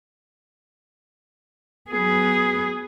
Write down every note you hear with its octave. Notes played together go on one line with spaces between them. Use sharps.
F#3 B3 G#4 B4